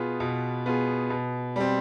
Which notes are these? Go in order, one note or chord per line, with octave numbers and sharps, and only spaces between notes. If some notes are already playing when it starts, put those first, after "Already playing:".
Already playing: B2 B3 F4 G#4
B2
B3 F4 G#4
B2
G3 C4